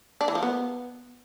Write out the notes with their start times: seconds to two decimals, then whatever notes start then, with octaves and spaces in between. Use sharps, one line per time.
0.21 D4
0.28 E3
0.35 F3
0.43 B3